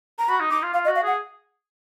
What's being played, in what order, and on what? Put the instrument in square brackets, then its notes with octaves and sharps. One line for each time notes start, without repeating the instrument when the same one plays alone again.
[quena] A#5
[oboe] F#4 [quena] B5
[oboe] D#4
[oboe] D#4 [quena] D6
[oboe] F4
[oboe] F4 [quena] F5
[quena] D#5
[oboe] F#4
[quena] F5
[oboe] G#4 [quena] F#5